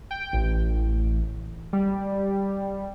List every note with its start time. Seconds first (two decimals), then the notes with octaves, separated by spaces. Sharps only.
0.11 G5
0.33 A1
1.73 G3